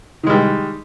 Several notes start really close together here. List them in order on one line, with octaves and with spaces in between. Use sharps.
D#3 G#3 G3